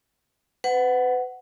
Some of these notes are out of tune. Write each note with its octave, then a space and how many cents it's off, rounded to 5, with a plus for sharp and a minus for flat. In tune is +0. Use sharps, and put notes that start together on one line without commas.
B4 +35 F#5 +5